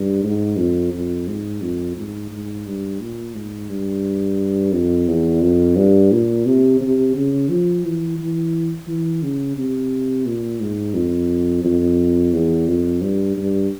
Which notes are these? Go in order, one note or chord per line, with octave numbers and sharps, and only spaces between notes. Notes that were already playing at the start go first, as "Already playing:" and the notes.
Already playing: G2
G#2
F2
F2
G#2
F2
G#2
G#2
G2
A#2
G#2
G2
F2
E2
F2
G2
A#2
C3
C3
C#3
F3
E3
E3
E3
C#3
C3
A#2
G#2
F2
F2
E2
F2
G2
G2